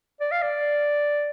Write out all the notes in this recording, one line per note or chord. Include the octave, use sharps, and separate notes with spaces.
D5
F5
D5